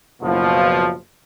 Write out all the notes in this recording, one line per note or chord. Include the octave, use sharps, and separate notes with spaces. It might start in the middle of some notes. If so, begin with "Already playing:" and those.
F#1 B2 F3